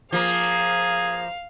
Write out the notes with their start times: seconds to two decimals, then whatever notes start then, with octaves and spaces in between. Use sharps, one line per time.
0.12 F3 A#3 G#4 F5